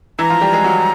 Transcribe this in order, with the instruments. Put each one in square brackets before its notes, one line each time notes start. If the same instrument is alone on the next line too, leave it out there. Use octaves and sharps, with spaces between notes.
[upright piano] E3 E4 [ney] A#5
[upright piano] F3 F4
G3 G4
G#3 G#4
F#3 F#4